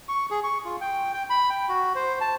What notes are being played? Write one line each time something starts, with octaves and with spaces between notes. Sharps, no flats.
C#6
G#4
C#6
F4
G5
G5
B5
G5
F#4
C5
A5